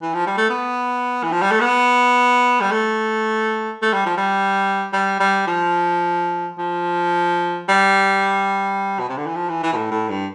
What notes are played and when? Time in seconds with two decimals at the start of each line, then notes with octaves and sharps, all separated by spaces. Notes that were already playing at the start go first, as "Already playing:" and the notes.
0.02 E3
0.14 F3
0.27 G3
0.38 A3
0.50 B3
1.23 E3
1.32 F3
1.42 G3
1.51 A3
1.61 B3
2.61 G3
2.72 A3
3.82 A3
3.93 G3
4.06 F3
4.17 G3
4.93 G3
5.20 G3
5.48 F3
6.59 F3
7.69 G3
9.00 B2
9.09 C3
9.17 D3
9.26 E3
9.35 F3
9.49 E3
9.63 E3
9.73 B2
9.76 A2
9.91 A2
10.09 G2